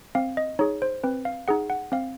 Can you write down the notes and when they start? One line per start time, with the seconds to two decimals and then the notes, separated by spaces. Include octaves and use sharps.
0.15 C4 F5
0.37 D#5
0.59 D#4 G#4 C#5
0.82 C5
1.04 C4 B4
1.25 F5
1.48 D#4 G#4 F#5
1.70 F#5
1.92 C4 F5